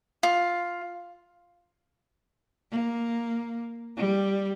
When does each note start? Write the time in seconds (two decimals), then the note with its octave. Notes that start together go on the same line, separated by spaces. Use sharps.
0.23 F4
2.71 A#3
3.96 G3